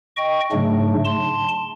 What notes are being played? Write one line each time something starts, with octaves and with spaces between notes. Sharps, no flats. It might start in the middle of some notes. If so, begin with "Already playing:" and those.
D#5 G5 C#6
G#2 C#3 F#3 A3 D4
A5 C6